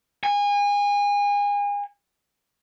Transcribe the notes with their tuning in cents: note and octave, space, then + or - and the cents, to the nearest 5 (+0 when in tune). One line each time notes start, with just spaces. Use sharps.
G#5 -30